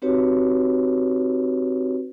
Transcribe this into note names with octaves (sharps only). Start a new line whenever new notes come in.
C4 D#4 F#4 G4 B4 C#5